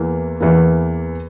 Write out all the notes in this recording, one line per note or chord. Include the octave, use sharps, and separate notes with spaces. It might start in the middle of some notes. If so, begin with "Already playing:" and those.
Already playing: E2 E3 A#3
E2 E3 A#3